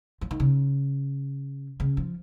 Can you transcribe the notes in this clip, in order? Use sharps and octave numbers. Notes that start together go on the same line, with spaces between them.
F3
D#3
C#3
C#3
F3